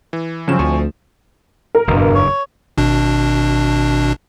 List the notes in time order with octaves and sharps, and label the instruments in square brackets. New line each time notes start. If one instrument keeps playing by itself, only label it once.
[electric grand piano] E3
[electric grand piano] G2 E7 [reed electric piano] C#3 F3 F#3 [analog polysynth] C4 C#4
[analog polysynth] D2 [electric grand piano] F3 C4 [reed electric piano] G#5 C#6
[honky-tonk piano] A#4
[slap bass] F#1 E2 [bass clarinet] G2 [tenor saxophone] B2
[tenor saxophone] C#5
[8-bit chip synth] G#1 B2 D4